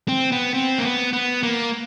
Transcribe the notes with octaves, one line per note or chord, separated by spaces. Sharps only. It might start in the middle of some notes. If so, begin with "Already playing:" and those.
C4
B3
C4
A#3
B3
B3
A#3